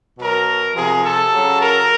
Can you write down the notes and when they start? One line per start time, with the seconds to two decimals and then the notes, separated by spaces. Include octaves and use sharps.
0.19 B2 F#3 A#4
0.75 C3 F3 G#4
1.04 A4
1.32 C#3 F#3
1.60 A#4